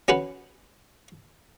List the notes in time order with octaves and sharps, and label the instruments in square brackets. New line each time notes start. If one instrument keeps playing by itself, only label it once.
[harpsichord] C#4 F#4 B4